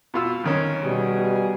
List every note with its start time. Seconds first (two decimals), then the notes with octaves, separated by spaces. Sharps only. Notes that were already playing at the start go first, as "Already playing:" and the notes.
0.14 B2 F4 E6
0.44 F2 D#3 C#4
0.83 B2 G3 G#4